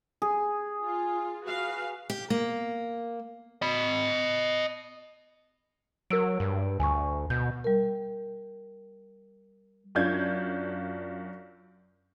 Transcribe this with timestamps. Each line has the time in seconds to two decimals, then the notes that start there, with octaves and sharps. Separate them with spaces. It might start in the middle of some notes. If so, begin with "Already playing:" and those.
0.22 G#4
0.84 F4
1.45 F#4 B4 F5
2.10 G4
2.30 A#3
3.62 D#5 B5
6.10 F#3 A#4 E6 D7
6.40 G2
6.80 D2 G#5 C#6
7.30 B2 G6
7.64 G3 A#4
9.95 F#2 D4 F4 G6 G#6